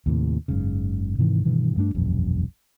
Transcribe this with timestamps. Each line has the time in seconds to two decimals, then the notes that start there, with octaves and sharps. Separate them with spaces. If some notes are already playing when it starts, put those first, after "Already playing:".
0.06 D#2 A2 C3
0.48 F#1 G#2 C#3
1.18 G#2 C3 D#3 E3
1.45 G2 B2 D#3 E3
1.77 G2 A3 B3 D4
1.95 E1 A#1 F#2